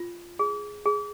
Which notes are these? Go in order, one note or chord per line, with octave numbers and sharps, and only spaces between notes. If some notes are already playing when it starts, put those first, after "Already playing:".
Already playing: F4
G#4
G#4